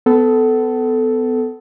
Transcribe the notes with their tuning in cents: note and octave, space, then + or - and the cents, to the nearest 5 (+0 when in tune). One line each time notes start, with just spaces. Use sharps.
B3 +30 A4 -5